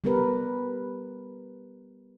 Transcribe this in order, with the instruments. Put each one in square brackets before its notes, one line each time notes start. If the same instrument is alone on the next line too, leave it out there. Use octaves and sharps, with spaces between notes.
[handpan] G3 B3 G4 A#4 B4